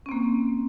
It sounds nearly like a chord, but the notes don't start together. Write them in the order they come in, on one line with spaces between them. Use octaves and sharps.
C#4 C4 A#3